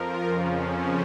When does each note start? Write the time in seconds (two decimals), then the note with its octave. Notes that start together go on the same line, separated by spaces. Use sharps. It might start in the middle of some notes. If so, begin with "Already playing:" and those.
Already playing: F2 F3 F4 A#4
0.26 F2 C#3 F3 C#4
0.61 C#4